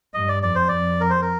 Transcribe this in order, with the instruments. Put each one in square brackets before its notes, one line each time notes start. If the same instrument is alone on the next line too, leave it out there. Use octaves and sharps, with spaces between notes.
[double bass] G2 [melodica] D#5
[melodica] D5
[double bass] F2 [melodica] D5
[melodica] C5
[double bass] F2 [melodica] D5
[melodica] A#4
C5
A#4